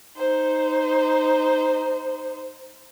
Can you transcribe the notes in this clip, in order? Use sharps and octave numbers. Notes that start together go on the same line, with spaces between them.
D#4 C5